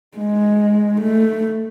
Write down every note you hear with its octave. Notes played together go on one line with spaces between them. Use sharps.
G#3
A3